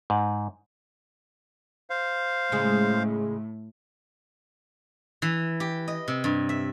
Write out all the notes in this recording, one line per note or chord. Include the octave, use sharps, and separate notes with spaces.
G#2
C5 F5
A2 C#3 G#3
E3
G4
D#5
C3
G2
E5